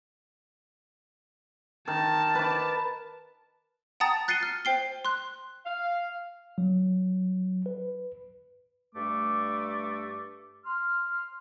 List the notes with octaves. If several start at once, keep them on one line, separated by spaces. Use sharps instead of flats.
D#3 A5
B4 D6
F#5 G5 A5 A#5 D#6 A6
F#6 A6 C7 C#7 D#7 G7
F6
C5 G5 C7 G7
C6 F#6
F5
F#3
B4
G2 A3 D6
C6 F6